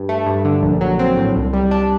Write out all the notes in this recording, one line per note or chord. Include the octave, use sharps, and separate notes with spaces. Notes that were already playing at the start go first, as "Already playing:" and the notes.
Already playing: G2
A3
G2
D3
A#1
F#3
C4
A2
C2
G3
D4